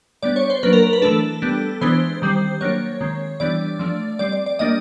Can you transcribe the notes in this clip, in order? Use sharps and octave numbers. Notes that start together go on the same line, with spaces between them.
G3 B3 D4 D5
C#5
C5
F#3 A#3 D4 B4
A#4
A#4
B4
E3 A3 D4 A4
G3 B3 D4
E3 G#3 B3 D4 C5
D#3 G3 C4
F#3 A#3 D4 C#5
D#3 G#3 C4
E3 G3 B3 D4 D5
F3 A3 D4
G3 C4 D5
D5
D5
G3 A#3 D4 D#5